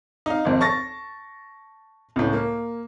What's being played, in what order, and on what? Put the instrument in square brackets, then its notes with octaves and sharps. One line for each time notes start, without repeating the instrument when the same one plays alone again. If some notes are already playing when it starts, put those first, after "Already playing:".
[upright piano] D#4 F5
G#1 F2
A5 C#6 A6 A#6
C#2 A2
A#3